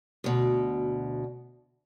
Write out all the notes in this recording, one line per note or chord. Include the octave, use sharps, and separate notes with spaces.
D2 B2